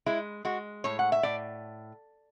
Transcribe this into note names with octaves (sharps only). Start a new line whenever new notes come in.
G#3 E4
G#3 F#4
A2 C#5
F#5
E5
A2 D5